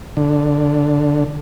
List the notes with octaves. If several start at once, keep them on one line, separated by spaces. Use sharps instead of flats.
D3